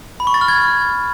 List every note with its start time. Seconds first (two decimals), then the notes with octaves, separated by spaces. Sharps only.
0.20 B5
0.27 C#6
0.34 A6
0.41 F6
0.48 G#6